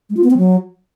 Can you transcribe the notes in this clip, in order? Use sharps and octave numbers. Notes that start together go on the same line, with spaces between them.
G#3
F4
B3
C4
F#3